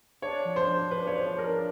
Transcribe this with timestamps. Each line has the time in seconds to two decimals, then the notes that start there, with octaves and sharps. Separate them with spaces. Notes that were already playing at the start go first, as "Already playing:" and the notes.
0.22 D4 C#5
0.45 F3
0.56 C5
0.69 F3
0.91 F3 B4
1.07 C#5
1.15 F3 C5
1.38 F3 A#4